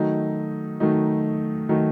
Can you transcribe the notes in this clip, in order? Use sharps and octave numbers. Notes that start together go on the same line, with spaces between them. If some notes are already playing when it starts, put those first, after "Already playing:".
Already playing: D#3 F#3 A3 D#4
D#3 F#3 A3 D#4
D#3 F#3 A3 D#4